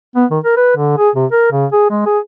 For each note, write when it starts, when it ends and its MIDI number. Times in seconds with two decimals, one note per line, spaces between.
0.16 0.25 59
0.31 0.39 51
0.44 0.57 70
0.57 0.73 71
0.77 0.95 50
0.98 1.10 68
1.16 1.26 48
1.32 1.51 70
1.52 1.66 49
1.73 1.89 68
1.91 2.03 56
2.06 2.19 68